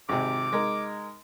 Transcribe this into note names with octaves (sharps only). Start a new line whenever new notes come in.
G#1 C3 D6
G#3 D#4 A#4